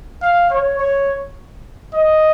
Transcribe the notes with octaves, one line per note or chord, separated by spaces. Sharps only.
F5
C#5
C#5
D#5